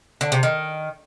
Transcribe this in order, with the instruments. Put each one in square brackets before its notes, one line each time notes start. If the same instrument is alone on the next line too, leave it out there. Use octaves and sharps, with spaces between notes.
[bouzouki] D3
C3
D#3